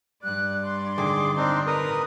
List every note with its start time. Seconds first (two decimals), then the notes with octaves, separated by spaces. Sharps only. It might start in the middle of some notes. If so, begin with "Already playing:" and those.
0.24 G2 D5 F#6
0.63 C6
0.98 A2 D3 D#3 G#4 D6
1.37 C4 D4 D#4
1.67 A#4 B4 A#5 D#6